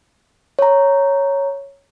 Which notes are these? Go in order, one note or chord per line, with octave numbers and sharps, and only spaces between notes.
C#5 A#5